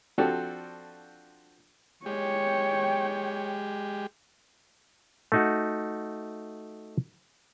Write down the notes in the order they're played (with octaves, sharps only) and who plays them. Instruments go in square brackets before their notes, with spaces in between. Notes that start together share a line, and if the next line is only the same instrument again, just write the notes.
[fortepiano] F3 C4 D4 F#4 G4 A4
[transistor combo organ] G#3 G4 [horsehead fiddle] C#5 G5
[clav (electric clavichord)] A3 D#4 F#4